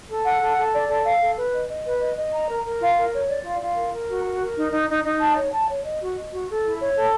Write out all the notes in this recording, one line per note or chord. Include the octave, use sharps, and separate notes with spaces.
A4
F#5
A4
A4
D5
A4
F5
A4
B4
D#5
D#5
B4
D#5
D#5
A#5
A#4
A#4
F4
A#4
C#5
D5
F4
F4
A#4
A#4
F#4
A#4
A#4
D#4
D#4
D#4
D#4
A5
C#5
A5
C#5
D#5
F#4
D#5
F#4
A4
E4
C#5
A4